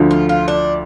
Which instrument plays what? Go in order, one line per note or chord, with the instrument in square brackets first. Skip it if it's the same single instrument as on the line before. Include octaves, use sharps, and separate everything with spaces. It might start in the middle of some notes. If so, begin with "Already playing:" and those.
Already playing: [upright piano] D2 D3 F3
[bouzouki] F4
F4
D4